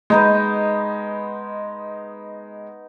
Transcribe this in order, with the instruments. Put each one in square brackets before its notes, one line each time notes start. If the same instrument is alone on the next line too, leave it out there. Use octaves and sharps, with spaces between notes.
[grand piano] G#3 [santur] B3 D#4 D#5